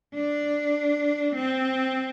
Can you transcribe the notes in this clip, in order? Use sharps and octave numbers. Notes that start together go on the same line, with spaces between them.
D4
C4